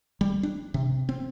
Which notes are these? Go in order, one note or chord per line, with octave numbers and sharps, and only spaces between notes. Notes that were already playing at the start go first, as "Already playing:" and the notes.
G3
D4
C3
C4